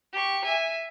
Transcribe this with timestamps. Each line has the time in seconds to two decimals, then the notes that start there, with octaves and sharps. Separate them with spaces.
0.13 G4 C#6
0.44 E5 G#5